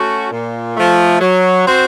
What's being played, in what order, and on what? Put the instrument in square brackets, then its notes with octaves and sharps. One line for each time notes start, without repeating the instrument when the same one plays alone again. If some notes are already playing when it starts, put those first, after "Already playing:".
Already playing: [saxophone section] A3 C#4 F#4
A#2
F3 A3
F#3
C4 F#4 C5